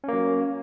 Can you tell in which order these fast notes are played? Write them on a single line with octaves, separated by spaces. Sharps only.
C#4 A#3 F#3